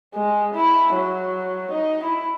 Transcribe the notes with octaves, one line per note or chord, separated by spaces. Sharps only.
G#3
E4
F#3
D#4
E4